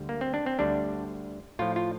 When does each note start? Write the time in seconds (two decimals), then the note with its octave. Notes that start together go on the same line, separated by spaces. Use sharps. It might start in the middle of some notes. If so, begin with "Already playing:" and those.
Already playing: D2 D3 G3
0.09 A#3
0.21 C4
0.34 D4
0.46 C4
0.59 D2 D3 G3 D4
1.59 A2 F3 F4
1.76 F4